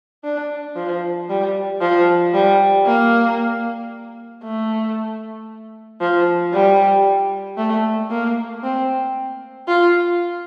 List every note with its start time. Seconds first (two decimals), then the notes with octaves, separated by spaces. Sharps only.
0.24 D4
0.76 F3
1.29 G3
1.81 F3
2.34 G3
2.86 A#3
4.44 A3
6.01 F3
6.53 G3
7.58 A3
8.11 A#3
8.63 C4
9.68 F4